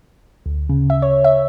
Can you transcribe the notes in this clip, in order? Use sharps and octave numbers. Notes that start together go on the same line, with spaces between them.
D2
C#3
E5
C#5
E5